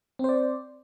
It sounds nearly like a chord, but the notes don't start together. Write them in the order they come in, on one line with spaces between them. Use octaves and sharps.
C4 C5 D5